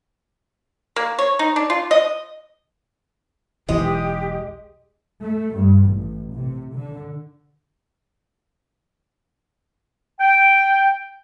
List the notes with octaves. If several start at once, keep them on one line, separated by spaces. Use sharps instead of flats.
A#3
C#5
D#4
D4
F4
D#5
E1 B1 E3 G#3 G4 D#5
A3
G2
A1
C3
D3
G5